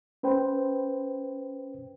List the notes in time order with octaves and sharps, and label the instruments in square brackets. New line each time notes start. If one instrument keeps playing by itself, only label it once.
[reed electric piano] C#4 B4 C5 G5